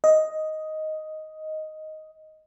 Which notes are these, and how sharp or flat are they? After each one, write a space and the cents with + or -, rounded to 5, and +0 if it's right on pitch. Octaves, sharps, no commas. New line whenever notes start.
D#5 +5